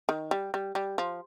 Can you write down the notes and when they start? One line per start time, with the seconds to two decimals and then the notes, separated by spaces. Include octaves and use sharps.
0.09 D#3
0.31 G3
0.54 G3
0.75 G3
0.98 F3